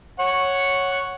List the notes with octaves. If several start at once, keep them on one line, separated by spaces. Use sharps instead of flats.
C#5 F#5